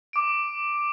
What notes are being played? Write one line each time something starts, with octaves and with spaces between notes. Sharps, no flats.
D6 D7